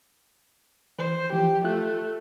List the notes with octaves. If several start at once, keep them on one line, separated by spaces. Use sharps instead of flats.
E3 C5
E3 F3 G4
A3 F4 F#6